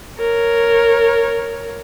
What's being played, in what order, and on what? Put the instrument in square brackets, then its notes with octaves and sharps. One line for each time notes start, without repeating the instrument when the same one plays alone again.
[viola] A#4 C#5